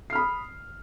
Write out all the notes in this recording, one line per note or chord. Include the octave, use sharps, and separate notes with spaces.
B5 D#6 F6 C7